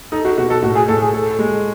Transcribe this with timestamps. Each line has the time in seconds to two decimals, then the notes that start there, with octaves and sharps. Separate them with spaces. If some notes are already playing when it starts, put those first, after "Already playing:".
0.12 D#4 A4
0.25 F#4
0.37 B2 F#4
0.50 A4
0.62 A2 F#4
0.75 G#4
0.88 A2 A4
1.01 G#4
1.14 A4
1.39 G#3